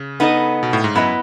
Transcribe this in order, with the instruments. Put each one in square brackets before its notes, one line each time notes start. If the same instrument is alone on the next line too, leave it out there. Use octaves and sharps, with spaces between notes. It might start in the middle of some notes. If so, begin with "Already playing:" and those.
Already playing: [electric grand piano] C#3
[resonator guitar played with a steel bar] B3 D#4 A4 D#5
[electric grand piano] B2
A2
G#2
[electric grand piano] F#2 [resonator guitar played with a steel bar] B3 E4 B4 D#5